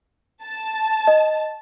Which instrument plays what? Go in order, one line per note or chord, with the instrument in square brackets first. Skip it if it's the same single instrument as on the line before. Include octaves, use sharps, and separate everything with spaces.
[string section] A5
[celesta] D#5